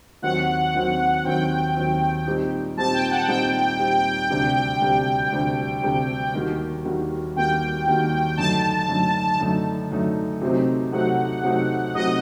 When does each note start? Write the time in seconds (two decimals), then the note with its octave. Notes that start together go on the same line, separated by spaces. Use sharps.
0.22 D#2 D#3 F#3 C4 F#5
0.74 D#2 D#3 F#3 C4
1.25 D#2 D#3 F#3 C4 G5
1.75 D#2 D#3 F#3 C4
2.27 A#2 G3 C4 D#4 G4
2.77 A#2 G3 C4 D#4 G4 A5
2.94 G5
3.11 F#5
3.28 A#2 G3 C4 D#4 G4 G5
3.79 A#2 G3 C4 D#4 G4
4.30 D2 C3 G3 D4
4.81 D2 C3 G3 D4
5.32 D2 C3 G3 D4 G5
5.83 D2 C3 G3 D4
6.34 D#2 D#3 G3 A#3 F#4
6.85 D#2 D#3 G3 A#3 F#4
7.36 D#2 D#3 G3 A#3 F#4 G5
7.87 D#2 D#3 G3 A#3 F#4
8.37 F#2 D3 A3 D#4 A5
8.88 F#2 D3 A3 D#4
9.40 F#2 D3 A3 D#4
9.91 F#2 D3 A3 D#4
10.41 C3 F#3 A3 C4 D#4
10.92 C3 F#3 A3 C4 D#4 F#5
11.43 C3 F#3 A3 C4 D#4
11.95 C3 F#3 A3 C4 D#4 D#5